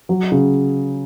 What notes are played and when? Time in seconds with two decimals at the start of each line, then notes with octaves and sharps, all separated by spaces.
0.09 F#3
0.32 C#3